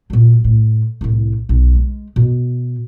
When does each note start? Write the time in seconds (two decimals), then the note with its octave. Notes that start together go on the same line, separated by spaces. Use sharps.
0.10 A#2 F#3
0.44 A2
1.01 C2 A2
1.49 B1
1.75 G#3
2.16 B2